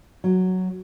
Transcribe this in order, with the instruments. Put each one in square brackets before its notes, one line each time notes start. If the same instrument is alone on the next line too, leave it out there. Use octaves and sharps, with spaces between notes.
[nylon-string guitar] F#3